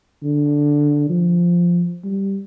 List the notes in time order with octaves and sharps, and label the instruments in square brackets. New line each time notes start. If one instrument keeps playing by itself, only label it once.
[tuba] D3
F3
G3